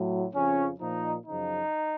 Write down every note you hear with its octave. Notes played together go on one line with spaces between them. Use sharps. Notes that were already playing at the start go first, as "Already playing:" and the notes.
Already playing: A2 F#3
F2 C#3 F3 C#4
A#2 F3 D#4
F#2 C#3 F3 D#4